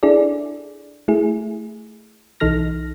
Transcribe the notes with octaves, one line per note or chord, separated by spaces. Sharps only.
D4 E4 G#4 A4 D5
A3 E4 G#4
B1 E3 D#4 A4 F6 A#6